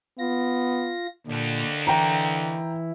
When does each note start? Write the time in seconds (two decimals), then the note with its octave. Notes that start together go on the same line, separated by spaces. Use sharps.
0.19 B3 F4 A#6
1.27 D#2 A#2 D3
1.87 E3 E4 G5 A#5